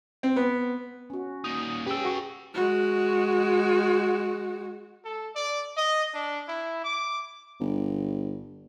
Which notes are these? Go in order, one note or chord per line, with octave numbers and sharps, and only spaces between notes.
C4
B3
C#4 F#4
A#2 D#4 D#6
C#4 G4 G#4 B4 G5 E6
F#4 C#6
G#3 F#4
A4
D5
D#5
D4
E4
D6
G1